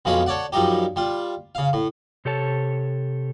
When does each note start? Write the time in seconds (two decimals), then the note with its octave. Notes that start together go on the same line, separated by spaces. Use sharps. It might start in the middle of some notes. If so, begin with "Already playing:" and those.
0.05 B1 F2 F3 G#3 C#4 B5
0.26 A4 C#5 D5 F#5
0.52 F#2 F3 G3 D#4 G4
0.96 G3 F4
1.55 C#3 F5
1.73 A2
2.25 C3 G4 A4 C#5 A5